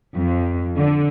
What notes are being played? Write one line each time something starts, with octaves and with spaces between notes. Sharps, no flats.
F2
D3